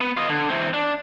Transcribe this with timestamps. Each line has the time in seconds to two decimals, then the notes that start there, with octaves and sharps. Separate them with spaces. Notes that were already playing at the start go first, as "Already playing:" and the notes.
0.01 B3
0.17 F4 D#5
0.29 D3
0.49 E3 C4
0.74 D4